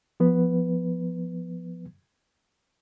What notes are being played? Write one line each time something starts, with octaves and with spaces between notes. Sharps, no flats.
F3 B3 B4